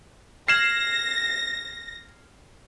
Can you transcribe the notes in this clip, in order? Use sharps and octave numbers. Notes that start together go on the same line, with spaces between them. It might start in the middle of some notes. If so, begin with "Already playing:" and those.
F6 G#6 A#6 C7 E7 F#7